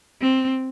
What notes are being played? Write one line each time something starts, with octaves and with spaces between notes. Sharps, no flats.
C4